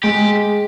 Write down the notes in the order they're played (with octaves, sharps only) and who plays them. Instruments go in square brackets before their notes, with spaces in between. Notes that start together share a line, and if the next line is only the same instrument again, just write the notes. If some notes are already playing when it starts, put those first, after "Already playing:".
[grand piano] G#3 [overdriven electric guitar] G4